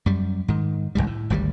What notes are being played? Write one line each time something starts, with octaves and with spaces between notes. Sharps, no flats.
F#2 G3
G#2 D#3
G#1 C#2 G#2 G3
A2
G#1 D2 C#3 G3